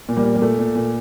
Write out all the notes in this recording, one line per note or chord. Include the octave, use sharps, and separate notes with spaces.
A#2
G3 A#3
A#2
G3
A#2 A3
A#2
A#2